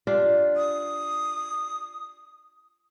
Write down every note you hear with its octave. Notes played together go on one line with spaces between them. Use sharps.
D4 F4 G4
D#6